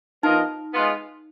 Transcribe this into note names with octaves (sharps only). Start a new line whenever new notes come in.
F3 B3 D#4 F4 A#4 D#5
G#3 B3 F4